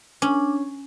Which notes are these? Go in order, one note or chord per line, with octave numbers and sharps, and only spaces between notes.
C#4 D4